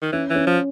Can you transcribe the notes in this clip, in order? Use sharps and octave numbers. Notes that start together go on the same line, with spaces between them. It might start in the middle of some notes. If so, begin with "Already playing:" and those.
D#3
E3 C#4
E3
C#4
F3